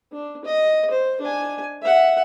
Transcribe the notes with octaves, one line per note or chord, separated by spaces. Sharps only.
D4
D#5
C5
D4 G#5
E5 F#5